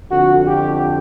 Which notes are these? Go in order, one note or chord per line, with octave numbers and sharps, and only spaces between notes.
F2 D3 F#4
G4